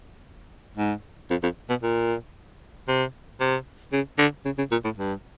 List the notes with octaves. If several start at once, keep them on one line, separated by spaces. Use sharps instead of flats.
G#2
F2
F2
B2
A#2
C3
C3
C#3
D3
C#3
C#3
A#2
A2
G2